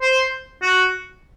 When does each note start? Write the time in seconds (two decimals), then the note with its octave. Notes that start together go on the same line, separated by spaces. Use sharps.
0.01 C5
0.62 F#4